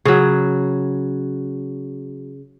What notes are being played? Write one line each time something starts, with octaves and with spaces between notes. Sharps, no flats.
C#3 F#3